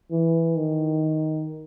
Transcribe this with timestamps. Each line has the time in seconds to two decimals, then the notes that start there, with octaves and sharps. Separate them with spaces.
0.11 E3
0.56 D#3